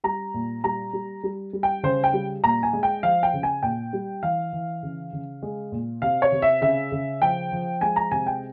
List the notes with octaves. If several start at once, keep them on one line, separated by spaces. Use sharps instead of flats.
G3 A#5
A#2
G3 A#5
G3
G3
G3
G5
C#3 C5
G5
G3
A#2 A#5
G#5
G#3
G5
F3 F5
G5
C#3
G#5
A#2 G5
G3
E3 F5
E3
C#3
C#3
G#3
A#2
C3 F5
C#5
C3
E5
C#3 E5
C#3
F3 G5
F3
G#3 G#5
A#5
C3 G#5
G5